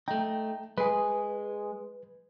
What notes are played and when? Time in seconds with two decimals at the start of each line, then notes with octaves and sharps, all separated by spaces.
0.08 A3 D#4 G5
0.78 G#3 G#4 B4